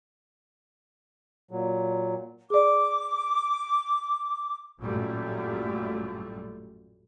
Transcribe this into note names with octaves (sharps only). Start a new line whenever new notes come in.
A#2 F#3
G#4 D5 D6
A1 F#2 A#2 G3 A3